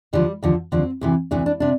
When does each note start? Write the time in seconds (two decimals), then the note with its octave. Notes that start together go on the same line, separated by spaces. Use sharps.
0.13 D#2 D3 F3 G3
0.43 D#2 D3 F3
0.72 D#2 D3 F3 C4
1.01 D2 C3 E3
1.31 D2 C3 E3 D4
1.46 D4
1.60 C3 D4